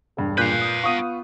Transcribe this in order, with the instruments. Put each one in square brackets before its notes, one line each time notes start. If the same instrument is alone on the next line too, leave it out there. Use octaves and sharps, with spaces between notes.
[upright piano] E1 G2
[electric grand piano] A#2 F#6 G6 [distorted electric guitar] B4 F5
[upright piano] D#6
[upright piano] B3 F4 [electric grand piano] C#6 D#6 D#7